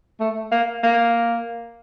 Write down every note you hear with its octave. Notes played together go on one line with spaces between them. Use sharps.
A3
A#3
A#3